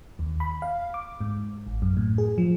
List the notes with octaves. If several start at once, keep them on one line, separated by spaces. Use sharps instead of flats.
D#2
B5
F5
D6
G#2
A1
F#2
A2
G#4
F3